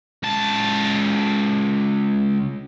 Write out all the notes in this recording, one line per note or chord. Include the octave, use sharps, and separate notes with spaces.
C#2 A5